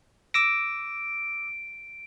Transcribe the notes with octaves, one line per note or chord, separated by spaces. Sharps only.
D6 E6 A#6 D7